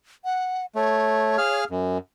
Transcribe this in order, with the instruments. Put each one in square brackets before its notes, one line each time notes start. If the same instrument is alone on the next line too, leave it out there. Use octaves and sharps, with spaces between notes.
[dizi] F#5
[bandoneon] A3 [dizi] C#5
[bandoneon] G#4 F5 F6
F#2